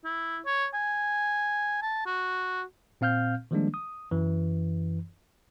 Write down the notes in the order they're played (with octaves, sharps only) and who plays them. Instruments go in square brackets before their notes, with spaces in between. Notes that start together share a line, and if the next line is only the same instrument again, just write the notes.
[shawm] E4
C#5
G#5
A5
F#4
[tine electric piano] A#2 C4 F5 F6 G6
D#3 F3 G3 G#3 A#3 D4
D#6
F#2 E3